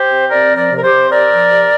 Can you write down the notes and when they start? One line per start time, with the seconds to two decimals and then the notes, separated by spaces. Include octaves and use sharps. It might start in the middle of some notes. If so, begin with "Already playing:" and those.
Already playing: G4 C5
0.11 C3
0.30 C4 A#4 D5
0.51 F3
0.57 A#4 D5
0.71 C3
0.77 A#4
0.84 G4 C5
0.91 C3
1.11 C4 A#4 D5
1.31 F3
1.51 C3